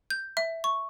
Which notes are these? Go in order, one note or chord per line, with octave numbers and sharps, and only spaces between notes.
G6
E5
C#6